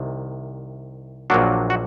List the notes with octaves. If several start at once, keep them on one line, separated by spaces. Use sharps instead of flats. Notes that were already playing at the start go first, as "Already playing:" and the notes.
Already playing: C2 C3 D#3
A#1 A#2 F#3 A#3 D4 F#4
F#4